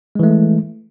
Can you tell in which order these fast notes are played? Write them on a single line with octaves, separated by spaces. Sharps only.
G#3 E3 A3